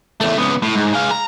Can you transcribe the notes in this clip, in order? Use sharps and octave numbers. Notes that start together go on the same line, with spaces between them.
E2 A3
C#2 B3
A2
G#2
G#3 F5
A#5